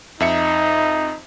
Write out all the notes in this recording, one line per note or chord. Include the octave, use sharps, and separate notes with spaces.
F2 D#4 E5 C#7